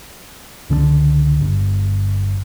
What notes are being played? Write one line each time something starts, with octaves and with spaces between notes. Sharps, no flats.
C#2 D3 F#3 D4
G1